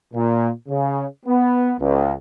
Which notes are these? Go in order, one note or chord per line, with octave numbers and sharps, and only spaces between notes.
A#2
C#3
B3
C#2